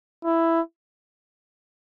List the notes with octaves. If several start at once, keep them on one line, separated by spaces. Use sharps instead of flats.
E4